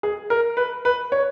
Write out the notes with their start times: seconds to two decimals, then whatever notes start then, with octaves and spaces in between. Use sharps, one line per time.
0.03 G#4
0.30 A#4
0.57 B4
0.85 B4
1.12 C#5